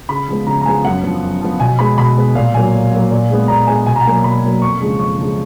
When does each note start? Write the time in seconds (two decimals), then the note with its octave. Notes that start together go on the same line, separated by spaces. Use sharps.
0.09 C#3 B5
0.28 F3 G#3 B3
0.47 C#3 A#5
0.61 A#5
0.66 F3 G#3 B3 G#5
0.84 F#2 F#5
1.03 F3 B3
1.22 F#2
1.41 F3 B3
1.60 B2 G#5
1.79 G#3 B3 B5
1.98 B2 B5
2.17 G#3 B3
2.35 A#2 F5
2.54 F#3 A#3 G#5
2.73 A#2
2.92 F#3 A#3
3.11 A#2
3.30 G#3 B3
3.48 A#2 A#5
3.67 G#3 B3 G#5
3.86 B2 G#5
3.96 A#5
4.01 F#5
4.05 F#3 A#3 G#5
4.24 B2 B5
4.43 F#3 A#3
4.62 F2 C#6
4.80 C#3 F3 G#3
4.99 F2 C#6
5.18 C#3 F3 G#3